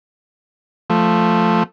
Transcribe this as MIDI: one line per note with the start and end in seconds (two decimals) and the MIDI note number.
0.90 1.63 53
0.90 1.63 57